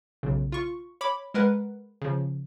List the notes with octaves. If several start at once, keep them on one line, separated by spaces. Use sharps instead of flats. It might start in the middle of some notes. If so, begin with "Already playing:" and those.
B1 C#3
F4 C#6
C#5 B5 D6
G#3 A#4 B4 F#5
C#3 F3